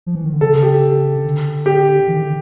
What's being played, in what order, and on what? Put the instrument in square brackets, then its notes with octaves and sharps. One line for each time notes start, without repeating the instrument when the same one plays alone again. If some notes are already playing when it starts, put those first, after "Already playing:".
[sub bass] F3
E3
D#3
D3
[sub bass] C#3 [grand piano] A4
[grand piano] G4
[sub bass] D3
[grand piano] G4
[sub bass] E3
D#3
D3